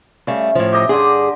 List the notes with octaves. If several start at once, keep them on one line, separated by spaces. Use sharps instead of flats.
C#3 G3 A3
A2 F3
G4 D#5 A#5
G2 D3 G#4 C6 D6